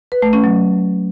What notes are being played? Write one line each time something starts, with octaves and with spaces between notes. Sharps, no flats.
B4
A3
C#4
F#3